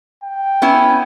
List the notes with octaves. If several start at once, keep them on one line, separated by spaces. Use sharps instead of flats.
G5
B3 C#4 E4